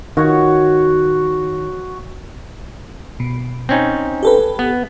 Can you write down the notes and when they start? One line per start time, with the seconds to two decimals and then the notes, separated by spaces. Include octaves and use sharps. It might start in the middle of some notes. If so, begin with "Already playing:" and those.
0.17 D#3 F#4 C#5
3.20 B2
3.69 C4 C#4 D#4
4.23 G4 A4 B4
4.59 B3